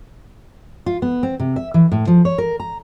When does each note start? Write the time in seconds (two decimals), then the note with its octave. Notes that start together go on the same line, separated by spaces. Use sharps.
0.86 F4
1.02 B3
1.23 C4
1.40 C3
1.56 E5
1.74 E3
1.92 A2
2.07 F3
2.25 C#5
2.38 A#4
2.60 A#5